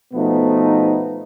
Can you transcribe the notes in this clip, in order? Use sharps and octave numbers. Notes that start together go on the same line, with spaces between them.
B2 F3 A3 B3 D#4